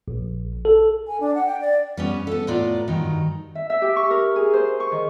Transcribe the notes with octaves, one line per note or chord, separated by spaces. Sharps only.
A#1
A4
G#5
D4
F#5
G5
D5
G3 B3 C#4
B3 A4
A2 B3 F4 D5 A#5
G2 D#3 F#3 D#4
E5
E5
G4
C#6
A#4
G#4
C5
C#6
D#3